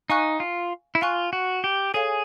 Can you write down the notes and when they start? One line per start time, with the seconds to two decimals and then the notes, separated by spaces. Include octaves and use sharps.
0.10 D#4 F5 G#5 C#6 F#6
0.40 F4
0.95 E4
1.01 F4 F5 G#5 C#6 F#6
1.33 F#4
1.64 G4
1.94 G#4 A4 C#5 F5 G#5